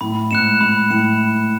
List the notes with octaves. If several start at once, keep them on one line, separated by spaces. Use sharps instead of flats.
A2 B5
G#2 F#6 C#7 E7
G#2 B5
A2 F#6 C#7 E7